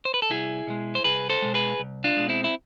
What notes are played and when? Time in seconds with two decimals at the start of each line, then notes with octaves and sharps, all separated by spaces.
0.05 C5
0.14 B4
0.22 A4
0.30 C2 E4 G#4
0.67 B2 G#3
0.95 C5
1.04 C2 G#4 B4
1.30 A4 C5
1.42 B2 G#3
1.54 G#4 B4
1.80 C2
2.04 D4 F4
2.17 B2 G#3
2.29 C4 E4
2.44 E4